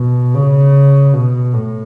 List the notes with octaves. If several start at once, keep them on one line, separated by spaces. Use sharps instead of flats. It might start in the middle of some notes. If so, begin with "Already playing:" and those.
Already playing: B2
C#3
B2
A2